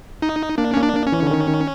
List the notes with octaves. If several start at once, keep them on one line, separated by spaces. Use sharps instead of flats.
D#4
A#3 D4
A#3 C#4
D4
A#3
C#4
E3
D3
D#3
D#3